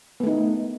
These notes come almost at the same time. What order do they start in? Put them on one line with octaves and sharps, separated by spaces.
B3 A3 D#4